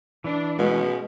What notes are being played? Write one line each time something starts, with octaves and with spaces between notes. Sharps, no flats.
E3 D4
B2 G#3 A3 C#4